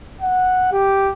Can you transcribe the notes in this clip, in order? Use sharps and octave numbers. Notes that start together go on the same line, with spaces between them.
F#5
G4